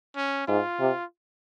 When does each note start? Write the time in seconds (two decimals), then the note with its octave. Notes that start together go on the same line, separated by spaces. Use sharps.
0.16 C#4
0.48 G#2 F4
0.80 C3